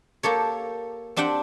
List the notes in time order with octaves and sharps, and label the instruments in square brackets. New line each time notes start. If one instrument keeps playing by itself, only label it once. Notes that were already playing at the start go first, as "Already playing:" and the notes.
[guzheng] A#3 G4 A4 C#5
C4 D4 G4 F#5 G5